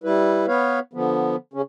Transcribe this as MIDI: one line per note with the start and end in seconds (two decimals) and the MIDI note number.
0.04 0.46 55
0.04 0.46 64
0.04 0.46 71
0.48 0.79 59
0.48 0.79 71
0.48 0.79 73
0.48 0.79 77
0.94 1.36 50
0.94 1.36 53
0.94 1.36 59
1.54 1.62 49
1.54 1.62 61